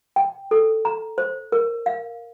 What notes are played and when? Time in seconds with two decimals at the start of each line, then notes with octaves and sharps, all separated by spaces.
0.16 G5
0.51 A4
0.85 A#5
1.18 C5
1.52 A#4
1.86 F5